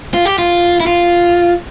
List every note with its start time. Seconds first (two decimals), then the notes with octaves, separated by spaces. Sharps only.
0.14 F4
0.25 G4
0.38 F4
0.80 E4
0.87 F4